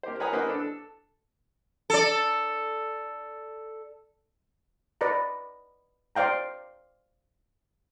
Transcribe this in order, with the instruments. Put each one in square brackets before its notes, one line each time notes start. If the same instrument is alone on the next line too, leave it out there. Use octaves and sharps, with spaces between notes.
[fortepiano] A#3 G4 C5
A#4 B4 C#5 G#5 A#5 D#6
A#3 C#4 B4 C5 D#5 F#5
D4 A4
A4
[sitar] A4 D5
[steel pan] B4 D5 D#5 A#5
C5 D5 F5 G5 A#5